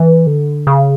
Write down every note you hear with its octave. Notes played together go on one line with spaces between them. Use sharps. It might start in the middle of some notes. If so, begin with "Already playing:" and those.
Already playing: E3
D3
C#3